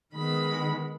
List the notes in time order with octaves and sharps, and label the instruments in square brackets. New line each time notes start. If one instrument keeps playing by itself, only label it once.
[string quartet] D#3 G#3 B3 B5